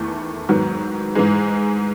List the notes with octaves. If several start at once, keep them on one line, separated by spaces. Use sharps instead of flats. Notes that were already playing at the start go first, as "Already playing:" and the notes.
Already playing: E2 D#3 A3 E4
G#2 D#3 F#3 B3
G#2 E3 G#3